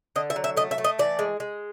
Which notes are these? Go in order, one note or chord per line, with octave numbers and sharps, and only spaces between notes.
D3 D#5
E5
F#3
E5
A3 D#5
E5
A3
D#5
E3 D5
G#3
G#3